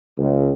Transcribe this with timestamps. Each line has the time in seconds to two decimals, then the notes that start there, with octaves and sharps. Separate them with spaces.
0.18 C#2